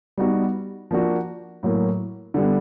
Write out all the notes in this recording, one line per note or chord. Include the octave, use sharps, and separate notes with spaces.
G3 B3 D#4 F#4
F3 A#3 D4 F#4
A2 F#3 A#3
D3 G3 B3